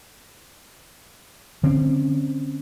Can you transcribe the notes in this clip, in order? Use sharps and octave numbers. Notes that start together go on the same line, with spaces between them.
D3 C4 C#4